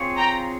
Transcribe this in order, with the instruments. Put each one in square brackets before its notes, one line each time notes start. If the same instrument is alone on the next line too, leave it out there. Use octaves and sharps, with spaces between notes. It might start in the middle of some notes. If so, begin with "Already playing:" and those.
Already playing: [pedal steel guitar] C4 F4 G#4 C#5
[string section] G5 A#5